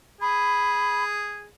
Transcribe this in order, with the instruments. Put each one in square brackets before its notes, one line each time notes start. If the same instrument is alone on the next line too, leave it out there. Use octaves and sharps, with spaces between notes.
[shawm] G#4 [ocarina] B5